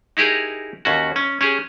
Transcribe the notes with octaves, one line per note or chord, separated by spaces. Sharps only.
D#4 E4 G4 G#4 A#4
D#2 C#4 F#4
C#4
C#4 G4 G#4